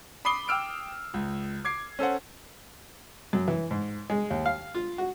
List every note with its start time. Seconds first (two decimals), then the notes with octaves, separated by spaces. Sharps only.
0.25 B5 D6 D#6 C7 G7
0.48 G5 D6 E6 F6 D7
1.14 C#2
1.65 D6 G#6 C7
1.99 C#4 A4 C5 F#5
3.33 F#2
3.48 E3
3.71 G#2
4.10 G#3
4.30 D#2
4.46 F5
4.75 F4
4.98 F#4